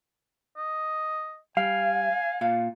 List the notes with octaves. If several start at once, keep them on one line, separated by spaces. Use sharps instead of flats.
D#5
G3 F5 G#5
A#2 F5